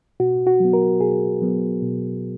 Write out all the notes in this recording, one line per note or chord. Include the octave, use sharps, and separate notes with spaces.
B2 F#4
F#4
F#3 B3
A#4
B2 G#4
F#3 B3
B2